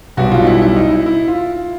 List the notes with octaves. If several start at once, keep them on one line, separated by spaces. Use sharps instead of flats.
B1 B2 G3 F#4
F4
D#4
E4
E4
D#4
E4
E4
F4